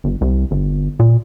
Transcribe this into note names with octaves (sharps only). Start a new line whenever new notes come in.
G1
C2
G1
A#2